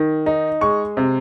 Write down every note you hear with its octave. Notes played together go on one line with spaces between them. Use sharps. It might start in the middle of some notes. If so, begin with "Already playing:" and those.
Already playing: D#3
D#4
G#3 C#6
C3